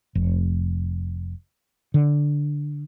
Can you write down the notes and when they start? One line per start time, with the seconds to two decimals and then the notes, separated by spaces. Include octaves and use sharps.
0.15 F1
1.94 D3